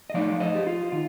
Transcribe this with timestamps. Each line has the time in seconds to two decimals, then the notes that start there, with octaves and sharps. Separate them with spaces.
0.10 D#5
0.14 F3 A3 D#4 D5 F5
0.40 C5 D#5
0.55 G4
0.67 F4
0.92 D#3 F4